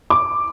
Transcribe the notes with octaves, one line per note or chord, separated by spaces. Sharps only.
D6